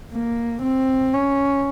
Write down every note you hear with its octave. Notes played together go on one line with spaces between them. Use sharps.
A#3
C4
C#4